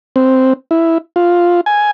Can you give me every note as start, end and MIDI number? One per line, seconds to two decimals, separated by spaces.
0.16 0.53 60
0.71 0.98 64
1.16 1.61 65
1.66 1.91 80